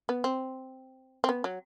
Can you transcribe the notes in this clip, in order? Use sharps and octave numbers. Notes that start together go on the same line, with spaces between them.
B3
C4
C4
B3
F#3